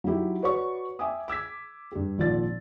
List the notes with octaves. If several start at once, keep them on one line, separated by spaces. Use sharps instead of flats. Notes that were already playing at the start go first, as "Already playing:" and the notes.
F#3 D#4 E4 G4
F#4 B4 C#5 D5 C#6
E5 G5 G#5 D6 D#6
D6 E6 G#6 B6
G2 G4
G#1 A#2 F3 D5 A6